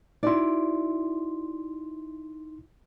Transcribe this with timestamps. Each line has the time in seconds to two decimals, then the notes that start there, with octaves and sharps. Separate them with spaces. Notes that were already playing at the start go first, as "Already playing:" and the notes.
0.23 D#4 E4 F#4 D5 C6